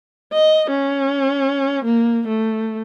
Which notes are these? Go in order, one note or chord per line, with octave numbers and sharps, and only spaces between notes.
D#5
C#4
A#3
A3